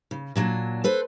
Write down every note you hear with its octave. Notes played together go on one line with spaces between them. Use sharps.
C#3
A#2 F#3 D4
A4 B4 C5